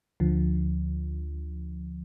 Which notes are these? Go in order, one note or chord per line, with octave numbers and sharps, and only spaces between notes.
D2 D3 F3